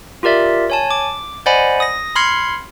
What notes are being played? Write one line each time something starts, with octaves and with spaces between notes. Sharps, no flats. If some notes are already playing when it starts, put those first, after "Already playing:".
F4 G4 A#4 D5 E5
C#5 G#5 A5
D6
C5 D5 D#5 F#5 G#5 B5
D#6 A#6
B5 C6 F6 G#6 C7 C#7